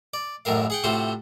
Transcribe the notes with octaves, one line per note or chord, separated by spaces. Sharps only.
D5
A1 F#2 A2 A#4 F5
G#4 F#5 G5
A2 C3 F4 F#4 C5